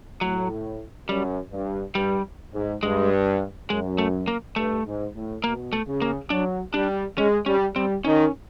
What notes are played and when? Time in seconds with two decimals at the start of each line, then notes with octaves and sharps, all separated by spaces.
0.21 A2 F#3
1.08 F#2 G3
1.52 G2
1.95 G2 G3
2.54 G#2
2.83 G2 G#3
3.69 F#2 G#3
3.98 A3
4.28 A#3
4.56 G2 A3
4.86 G#2
5.15 A2
5.44 B2 A#3
5.73 A3
5.87 C#3
6.02 A#3
6.30 F#3 D4
6.74 G3 D4
7.18 G#3 C#4
7.46 G3 C#4
7.75 G3 C4
8.05 D#3 C#4